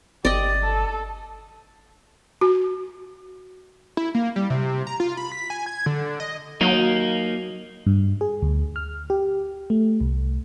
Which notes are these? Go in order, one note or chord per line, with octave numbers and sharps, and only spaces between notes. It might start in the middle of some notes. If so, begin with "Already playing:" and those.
G1 G4 D5 D#5
A4
F#4
E4
A#3
G3
C3
A#5
F4
B5
B6
G#5
G#6
D3
D#5
F#3 A#3 D#4
G2
G#4
D2
F6
G4
A3
C2